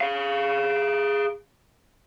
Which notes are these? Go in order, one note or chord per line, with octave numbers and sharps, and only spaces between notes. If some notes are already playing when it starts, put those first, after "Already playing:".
G#4 F5